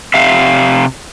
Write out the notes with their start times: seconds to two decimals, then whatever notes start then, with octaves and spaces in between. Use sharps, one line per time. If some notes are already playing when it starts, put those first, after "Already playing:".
0.14 C3 E5 F5